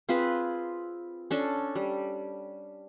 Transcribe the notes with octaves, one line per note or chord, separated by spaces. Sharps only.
C4 F4 G#4 B4
C#4 D4 A4
G3